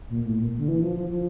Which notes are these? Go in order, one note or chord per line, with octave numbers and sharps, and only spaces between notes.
A#2
A2
A#2
D3
E3
F3
F3
F3